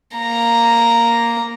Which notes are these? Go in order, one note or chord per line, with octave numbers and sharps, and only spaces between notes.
A#3 A#5